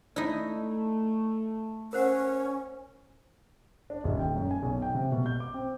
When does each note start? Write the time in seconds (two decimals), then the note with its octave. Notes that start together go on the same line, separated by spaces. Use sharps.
0.16 A3 D#4 E4 D5
1.93 C#4 A#4 C5 F#5
3.90 D4
4.04 D#1
4.19 G5
4.35 F#2
4.51 G#5
4.63 B1
4.82 G5
4.95 C3
5.12 B2
5.26 G6
5.40 D6
5.54 C4